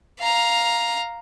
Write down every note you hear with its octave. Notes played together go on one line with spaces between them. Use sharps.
F5 A#5